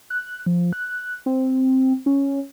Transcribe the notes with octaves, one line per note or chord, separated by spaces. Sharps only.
F#6
F3
F#6
C4
C#4